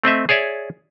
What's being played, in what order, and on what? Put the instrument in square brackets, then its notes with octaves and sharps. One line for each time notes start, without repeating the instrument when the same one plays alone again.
[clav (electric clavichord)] A3 C4 D#5 E5
G#4 C#5 D5 E5